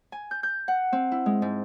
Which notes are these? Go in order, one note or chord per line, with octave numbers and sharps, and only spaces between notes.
G#5
G6
G6
F#5
C4
E4
G#3
G#2